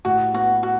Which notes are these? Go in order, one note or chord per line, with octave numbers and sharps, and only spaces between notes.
A2 F#4
B3 F#4
F#4